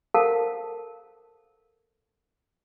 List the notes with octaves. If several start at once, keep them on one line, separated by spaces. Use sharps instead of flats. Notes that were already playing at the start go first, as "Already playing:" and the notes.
A4 A#4 C5 F5 F#5 A5